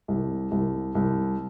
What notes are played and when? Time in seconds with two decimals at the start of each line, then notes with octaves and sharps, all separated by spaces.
0.08 C2
0.51 C2
0.95 C2